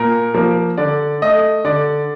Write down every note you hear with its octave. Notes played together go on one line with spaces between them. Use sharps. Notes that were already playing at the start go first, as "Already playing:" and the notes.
Already playing: A#2 A#4
F3 A#3
D3 D5
A3 D#5
D3 D5